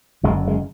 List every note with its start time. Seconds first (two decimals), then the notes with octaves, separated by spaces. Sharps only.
0.23 F#1 F#2 D3 G#3
0.47 G#3